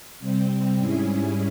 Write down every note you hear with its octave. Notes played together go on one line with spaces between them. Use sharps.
C3 G3 C4
G#2 G3 C#4 E4 G#4